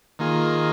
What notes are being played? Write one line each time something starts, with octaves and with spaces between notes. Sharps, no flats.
D#3 A#3 F4 G#4